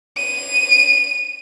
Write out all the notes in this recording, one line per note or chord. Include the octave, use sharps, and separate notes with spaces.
D#7